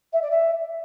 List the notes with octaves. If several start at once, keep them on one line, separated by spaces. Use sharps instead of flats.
E5
D5
E5